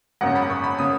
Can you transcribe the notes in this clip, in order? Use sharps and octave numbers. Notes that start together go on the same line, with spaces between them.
G#1 F#2 C#3 F#5
B5
C#6
B5
C#3 D#6